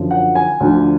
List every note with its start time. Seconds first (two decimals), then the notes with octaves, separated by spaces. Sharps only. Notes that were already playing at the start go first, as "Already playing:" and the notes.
Already playing: F#2 D3 F3
0.11 F#5
0.35 G#5
0.60 D2 D3 F3